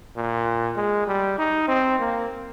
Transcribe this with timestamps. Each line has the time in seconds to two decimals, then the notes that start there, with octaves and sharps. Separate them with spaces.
0.16 A#2
0.77 G#3
1.07 G3
1.38 D#4
1.68 C4
1.99 A#3